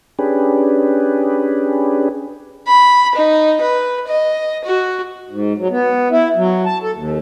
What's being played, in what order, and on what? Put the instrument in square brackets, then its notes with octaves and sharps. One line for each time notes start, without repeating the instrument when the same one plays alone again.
[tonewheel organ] C#4 D4 G4 G#4 B4
[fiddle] B5
D#4
B4
D#5
F#4
[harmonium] G#2
F#3
B3
E4
F#3
A5
A4
D#2